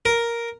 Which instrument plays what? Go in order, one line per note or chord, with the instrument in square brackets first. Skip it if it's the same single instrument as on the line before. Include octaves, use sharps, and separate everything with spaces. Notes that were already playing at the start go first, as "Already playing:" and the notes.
[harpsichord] A#4